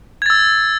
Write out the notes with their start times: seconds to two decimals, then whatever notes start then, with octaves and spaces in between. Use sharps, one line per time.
0.22 G#6
0.26 A6
0.30 E6